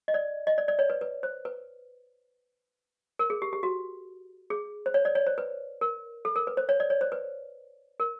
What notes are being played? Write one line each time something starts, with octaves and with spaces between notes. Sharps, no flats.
D#5
D5
D#5
D5
D5
C#5
B4
B4
C5
B4
A#4
G#4
G4
G4
F#4
G#4
C5
C#5
D5
C#5
C5
B4
A#4
A4
A#4
B4
C5
C#5
D5
C#5
C5
B4
A#4